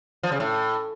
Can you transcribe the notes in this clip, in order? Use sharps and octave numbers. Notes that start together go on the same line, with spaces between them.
F3
C#3
A2